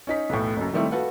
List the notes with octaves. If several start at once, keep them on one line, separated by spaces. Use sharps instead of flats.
C#4 D#4 B6
B1 E2 A2
F#1 F#2
D#3 G3 A3 C4 E4
F#4 A4 B4 F5 F#5